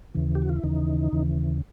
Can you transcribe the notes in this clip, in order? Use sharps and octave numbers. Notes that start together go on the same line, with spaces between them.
D#2 C#3 E3
G4
F#4
F4
E4
D#2 C#3 E3 D#4
D#2 C#3 E3